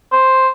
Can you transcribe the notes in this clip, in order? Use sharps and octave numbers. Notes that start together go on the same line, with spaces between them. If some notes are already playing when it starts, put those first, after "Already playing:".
C5